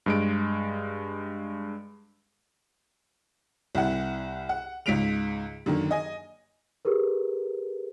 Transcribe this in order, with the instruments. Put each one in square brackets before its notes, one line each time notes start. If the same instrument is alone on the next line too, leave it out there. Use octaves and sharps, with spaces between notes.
[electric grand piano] G2 G#3 D7
[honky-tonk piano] C2 E4 F#5
F#5
C#2 G#2 B6 D7 F7
F#2 D3 D#3 A#3
D#5 G#5
[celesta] G4 G#4 A#4 B4